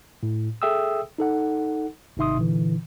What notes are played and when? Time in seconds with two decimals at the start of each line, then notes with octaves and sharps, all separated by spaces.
0.23 A2
0.62 G#4 A4 E5 G5 D#6 E6
1.18 D#4 A4 F#5
2.17 G#1 C3 D#4 E5 C6 D#6
2.37 A#2 D3 E3